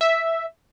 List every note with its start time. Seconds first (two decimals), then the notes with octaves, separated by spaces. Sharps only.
0.01 E5